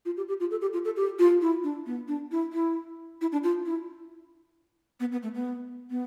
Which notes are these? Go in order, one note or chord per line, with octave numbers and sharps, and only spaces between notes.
F4
G4
G4
F4
A4
G4
F4
A4
G4
F4
E4
D4
B3
D4
E4
E4
E4
D4
F4
E4
B3
B3
A3
B3
B3